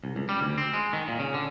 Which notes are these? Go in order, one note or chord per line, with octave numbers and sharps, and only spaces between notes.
C2
C#2
G3
D2
C4
G#3
D#3
A#2
C#3
D3